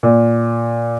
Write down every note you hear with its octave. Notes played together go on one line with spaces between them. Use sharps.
A#2